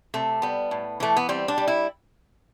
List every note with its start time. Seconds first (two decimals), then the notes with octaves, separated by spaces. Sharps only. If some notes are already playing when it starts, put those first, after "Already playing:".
0.14 C3 A3
0.42 G3 B3
0.71 A2
1.00 E3 A3
1.16 B3
1.29 G3 C4
1.48 D4
1.58 G3
1.68 E4